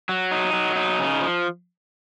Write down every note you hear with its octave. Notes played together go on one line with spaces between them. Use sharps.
F#3
D#4
F#3
D#4
C#3
F3